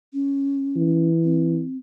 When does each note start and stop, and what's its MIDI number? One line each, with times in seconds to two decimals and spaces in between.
0.14 1.09 61
0.76 1.64 52
1.24 1.77 60